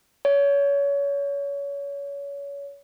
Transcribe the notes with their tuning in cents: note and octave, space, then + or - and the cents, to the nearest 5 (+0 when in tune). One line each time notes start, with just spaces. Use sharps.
C#5 +30